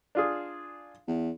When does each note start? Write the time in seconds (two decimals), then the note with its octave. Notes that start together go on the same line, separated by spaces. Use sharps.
0.15 D4 F4 G#4
1.07 E2